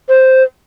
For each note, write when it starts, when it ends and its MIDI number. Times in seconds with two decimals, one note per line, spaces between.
0.09 0.43 72